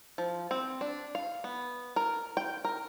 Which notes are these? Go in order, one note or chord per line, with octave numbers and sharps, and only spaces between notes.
F3
C4
D4
F5
B3
A#4
G5
A#4